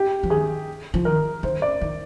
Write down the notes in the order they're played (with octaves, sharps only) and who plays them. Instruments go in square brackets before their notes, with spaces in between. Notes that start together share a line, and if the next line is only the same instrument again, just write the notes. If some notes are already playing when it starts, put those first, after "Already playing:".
Already playing: [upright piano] G4
[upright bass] F3
[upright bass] D#3 [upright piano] G#4
[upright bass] F3
[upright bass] D#3 [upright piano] A#4
[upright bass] D#3 [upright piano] C5
[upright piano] D5
[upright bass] D#3